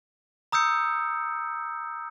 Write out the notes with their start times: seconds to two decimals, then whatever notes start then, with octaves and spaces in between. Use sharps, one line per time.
0.52 A#5 D#6 E6 G6 C#7